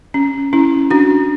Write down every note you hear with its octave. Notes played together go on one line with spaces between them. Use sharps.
C#4
C#4 E4
D4 F#4